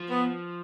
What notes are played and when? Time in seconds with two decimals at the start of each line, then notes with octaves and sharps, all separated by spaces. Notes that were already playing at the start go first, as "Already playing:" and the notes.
Already playing: F3
0.09 B3